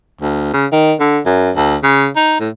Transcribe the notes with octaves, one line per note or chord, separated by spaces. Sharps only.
D2
C#3
D#3
D3
F#2
D2
C#3
D#4
A2